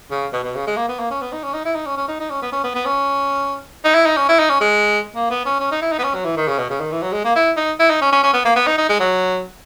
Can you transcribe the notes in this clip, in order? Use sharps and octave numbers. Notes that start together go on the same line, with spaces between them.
C#3
B2
B2
C#3
G#3
A#3
B3
A#3
C#4
B3
D#4
C#4
D#4
E4
D#4
C#4
C#4
D#4
D#4
C#4
B3
C#4
B3
B3
C#4
D#4
E4
D#4
C#4
E4
D#4
C#4
G#3
A#3
B3
C#4
C#4
D#4
E4
D#4
B3
C#4
F#3
E3
D#3
C#3
B2
C#3
D#3
E3
F#3
G#3
A#3
E4
D#4
E4
D#4
C#4
C#4
C#4
B3
A#3
B3
D#4
D#4
G#3
F#3